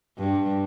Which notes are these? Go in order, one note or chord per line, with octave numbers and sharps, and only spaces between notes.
G2